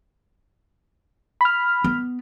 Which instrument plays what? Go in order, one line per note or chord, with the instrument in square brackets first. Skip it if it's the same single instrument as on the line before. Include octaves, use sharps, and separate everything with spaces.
[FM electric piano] B5 F6
[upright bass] B3